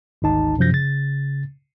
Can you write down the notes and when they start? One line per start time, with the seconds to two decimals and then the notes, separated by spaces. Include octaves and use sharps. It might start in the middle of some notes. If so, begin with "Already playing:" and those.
0.22 G#1 D2 D#4 A5
0.58 F#2 C3 F3 G6 A#6
0.72 C#3 A6